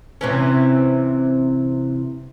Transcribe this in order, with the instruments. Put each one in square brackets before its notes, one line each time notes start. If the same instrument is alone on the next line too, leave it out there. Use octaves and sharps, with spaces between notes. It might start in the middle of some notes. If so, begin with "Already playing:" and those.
[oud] C3 E3 C#4